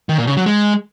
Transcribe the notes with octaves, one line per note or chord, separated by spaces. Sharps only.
D#3
A#2
C#3
F#3
G#3